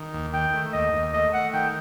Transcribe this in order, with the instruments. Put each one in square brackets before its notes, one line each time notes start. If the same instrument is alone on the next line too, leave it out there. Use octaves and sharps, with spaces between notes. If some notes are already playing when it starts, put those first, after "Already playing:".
Already playing: [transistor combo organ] D#3
D#2
[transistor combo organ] D#3 [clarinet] G5
[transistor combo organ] A3
[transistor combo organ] D#2 [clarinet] D#5
[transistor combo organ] D#2
[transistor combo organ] A3 [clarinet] D#5
[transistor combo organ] A3 [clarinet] F#5
[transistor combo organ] D#3 [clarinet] G5